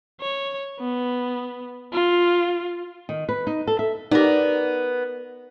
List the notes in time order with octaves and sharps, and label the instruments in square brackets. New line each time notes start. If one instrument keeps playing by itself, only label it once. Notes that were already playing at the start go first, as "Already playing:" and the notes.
[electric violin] C#5
B3
F4
[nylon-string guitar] D#3
B4
D#4
A4
E5
[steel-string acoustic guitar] B3 [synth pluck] D#4 G4 [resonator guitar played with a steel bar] A#4 D5